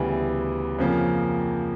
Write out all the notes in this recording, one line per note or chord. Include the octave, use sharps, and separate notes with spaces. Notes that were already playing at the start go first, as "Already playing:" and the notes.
Already playing: D2 C#3 E3 G3 B3
F2 C#3 F3 A#3